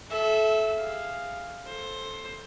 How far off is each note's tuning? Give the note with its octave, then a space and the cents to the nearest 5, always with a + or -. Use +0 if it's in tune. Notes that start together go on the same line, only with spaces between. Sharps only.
A4 -25 E5 +0
G#4 -20 F5 +0
A4 +0 C5 +15